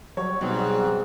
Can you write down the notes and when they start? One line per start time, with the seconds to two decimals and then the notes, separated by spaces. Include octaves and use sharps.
0.17 F#3 G3 C#5
0.41 G#2 B2 C4